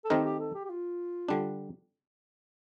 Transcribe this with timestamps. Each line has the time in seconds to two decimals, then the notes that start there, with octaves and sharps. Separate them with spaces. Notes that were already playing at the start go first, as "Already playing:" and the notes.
0.04 A4
0.10 D#3 A3 C4 D#4 G4 A#4
0.25 G4
0.39 A4
0.54 G4
0.65 G4
0.69 F4
1.29 D3 G3 D4